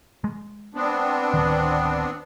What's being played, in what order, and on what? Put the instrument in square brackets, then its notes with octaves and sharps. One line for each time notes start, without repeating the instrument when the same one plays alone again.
[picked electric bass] G#3
[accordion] B3 C4 D4
[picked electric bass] D1 D#3